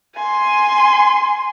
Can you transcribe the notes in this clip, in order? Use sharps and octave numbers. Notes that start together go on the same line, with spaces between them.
G#5 C6